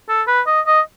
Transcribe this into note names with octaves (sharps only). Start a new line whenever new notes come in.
A4
B4
D#5
D#5